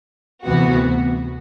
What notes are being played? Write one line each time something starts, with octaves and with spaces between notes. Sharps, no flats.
D2 C3 E3 B3 F#4